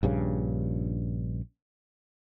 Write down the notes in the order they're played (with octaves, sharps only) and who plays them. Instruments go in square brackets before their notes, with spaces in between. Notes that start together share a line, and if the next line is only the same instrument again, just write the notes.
[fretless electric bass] A#1 G2 C#3